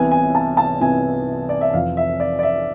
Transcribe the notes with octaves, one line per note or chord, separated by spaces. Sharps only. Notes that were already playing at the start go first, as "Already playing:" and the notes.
Already playing: C2 C3 E3 B3 G#5
G#5
A5
A5
C2 C3 E3 B3 G#5
D5
E5
F1 F2 E3 F5
E5
D5
D5
E5